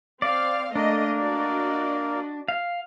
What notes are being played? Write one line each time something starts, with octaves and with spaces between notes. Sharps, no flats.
C4 D5 F5
A3 A#3 D4 A#4 D#5
F#4 D5 D#5
F5